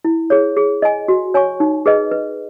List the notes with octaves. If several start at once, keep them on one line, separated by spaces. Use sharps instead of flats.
E4
G#4 C#5
G#4
D#5 G#5
F#4
C#5 G#5 C#6
D#4
G#4 B4 D#5
B4